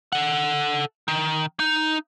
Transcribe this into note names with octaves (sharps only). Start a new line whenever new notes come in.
A4 F#5
D#3
D#4